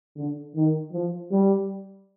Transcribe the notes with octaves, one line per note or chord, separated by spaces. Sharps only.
D3
D#3
F3
G3